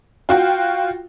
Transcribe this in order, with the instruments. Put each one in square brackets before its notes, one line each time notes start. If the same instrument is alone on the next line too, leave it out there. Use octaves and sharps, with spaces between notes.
[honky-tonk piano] F4 F#4 G5